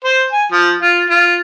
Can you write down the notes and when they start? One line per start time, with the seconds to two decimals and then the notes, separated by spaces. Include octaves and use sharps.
0.04 C5
0.32 G#5
0.52 F3
0.82 F4
1.10 F4